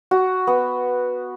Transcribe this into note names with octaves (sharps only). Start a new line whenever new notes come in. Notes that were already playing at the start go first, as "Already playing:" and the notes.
F#4
B3